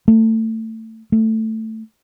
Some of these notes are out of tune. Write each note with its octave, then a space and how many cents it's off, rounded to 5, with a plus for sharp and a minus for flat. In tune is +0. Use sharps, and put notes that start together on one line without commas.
A3 +25
A3 +10